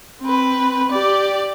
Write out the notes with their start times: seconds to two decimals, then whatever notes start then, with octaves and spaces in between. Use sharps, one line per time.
0.21 C4 B4
0.92 G4 D5